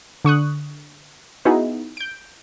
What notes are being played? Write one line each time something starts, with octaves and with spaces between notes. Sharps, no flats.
D3 C#6 D#6 F#6
B3 D#4 E4 F#4 G#4
G6 D7